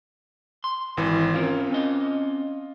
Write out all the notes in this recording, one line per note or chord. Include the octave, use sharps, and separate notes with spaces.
C6
G#1 E3
C4 C#4 F4 A#4
C4 C#4 D#5